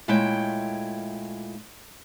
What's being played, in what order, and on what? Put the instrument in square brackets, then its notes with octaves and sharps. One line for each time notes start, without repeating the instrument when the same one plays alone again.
[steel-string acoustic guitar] A#2 G#3 A3 E4 C#5 G5